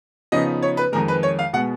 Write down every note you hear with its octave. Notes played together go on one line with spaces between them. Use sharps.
C#3 F3 B3 D#4 D#5
C#5
B4
F2 D#3 G#3 A#4
B4
C#5
F5
B2 G#3 B3 F#5